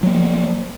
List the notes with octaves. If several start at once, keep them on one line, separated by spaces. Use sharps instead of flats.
F3 F#3 A#3